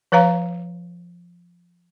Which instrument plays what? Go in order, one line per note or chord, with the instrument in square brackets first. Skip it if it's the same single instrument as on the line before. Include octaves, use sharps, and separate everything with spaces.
[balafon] F3 B4 C#5 F5 A#5